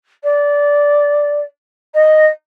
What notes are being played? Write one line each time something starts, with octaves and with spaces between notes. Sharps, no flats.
D5
D#5